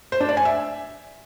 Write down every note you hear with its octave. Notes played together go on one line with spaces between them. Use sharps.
C5
D4
D5
G#5
E5